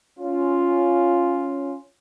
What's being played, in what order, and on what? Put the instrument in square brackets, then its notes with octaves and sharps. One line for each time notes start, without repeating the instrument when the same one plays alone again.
[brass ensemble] C#4 F4